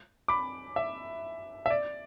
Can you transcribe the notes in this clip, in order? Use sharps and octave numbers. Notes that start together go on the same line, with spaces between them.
B5 D6
E5
E5
D5